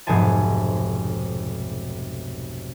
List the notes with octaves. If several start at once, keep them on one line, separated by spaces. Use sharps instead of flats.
F1 B1 G#2 C5 G#5 A5